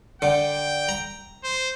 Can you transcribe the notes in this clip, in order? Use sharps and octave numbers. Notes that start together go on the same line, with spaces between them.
D3 G5
A#5
C5